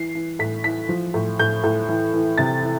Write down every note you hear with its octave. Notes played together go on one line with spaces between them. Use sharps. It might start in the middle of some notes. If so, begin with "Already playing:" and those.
Already playing: E3 C7
E3
A2 B6
E3 B6
F3
A2
A2 G6
A2
E3
E3
C3 A6
E3